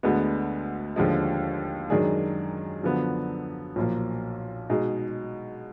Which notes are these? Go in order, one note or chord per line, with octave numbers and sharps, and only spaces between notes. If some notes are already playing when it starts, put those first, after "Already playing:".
D2 D3 G#3 B3
D#2 D3 F3 G#3
F#2 D#3 G#3 D4 G#4
F#2 D3 F3 B3
B1 A#2 F3 A#3
B2 G#3 D#4 G#4